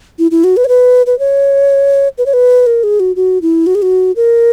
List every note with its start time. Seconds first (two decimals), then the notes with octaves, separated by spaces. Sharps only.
0.19 E4
0.31 E4
0.44 F#4
0.57 B4
0.65 C#5
0.68 B4
1.06 B4
1.19 C#5
2.18 B4
2.26 C#5
2.33 B4
2.66 A#4
2.83 G#4
3.00 F#4
3.16 F#4
3.42 E4
3.67 F#4
3.75 G#4
3.82 F#4
4.16 A#4